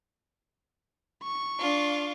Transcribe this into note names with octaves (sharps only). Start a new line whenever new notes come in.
C#6
D4 F4